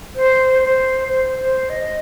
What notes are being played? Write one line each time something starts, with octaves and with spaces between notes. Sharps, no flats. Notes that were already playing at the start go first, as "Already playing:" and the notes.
C5
C5
C5
C5
D#5